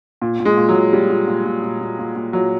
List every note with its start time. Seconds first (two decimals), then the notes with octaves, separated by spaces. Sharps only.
0.22 A#2
0.40 A#2
0.45 G#3
0.57 A#2
0.69 F#3
0.75 A#2
0.93 A#2 G3
1.10 A#2
1.28 A#2
1.45 A#2
1.63 A#2
1.81 A#2
1.99 A#2
2.16 A#2
2.33 A#2 F#3